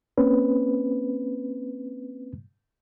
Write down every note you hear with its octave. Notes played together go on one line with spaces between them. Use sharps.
A#3 C4 C#4 B4